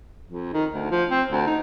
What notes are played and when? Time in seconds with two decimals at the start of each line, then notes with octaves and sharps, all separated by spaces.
0.28 F2
0.53 D#3
0.72 D2
0.91 F3
1.10 C4
1.31 D2
1.47 D#4